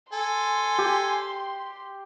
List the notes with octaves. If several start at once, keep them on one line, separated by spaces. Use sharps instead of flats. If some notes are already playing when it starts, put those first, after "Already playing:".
A4 G#5 C6
G4